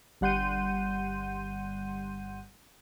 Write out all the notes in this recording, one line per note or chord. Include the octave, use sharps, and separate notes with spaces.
G1 G3 F#5 C6 G6 D#7